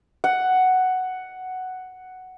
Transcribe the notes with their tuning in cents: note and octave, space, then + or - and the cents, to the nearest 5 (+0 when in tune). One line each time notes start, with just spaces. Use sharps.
F#5 +5